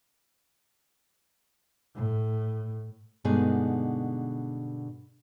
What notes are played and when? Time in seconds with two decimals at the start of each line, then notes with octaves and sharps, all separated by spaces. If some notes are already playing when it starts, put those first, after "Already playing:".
1.95 A2
3.24 G2 B2 D3 G#3 D#4 G#5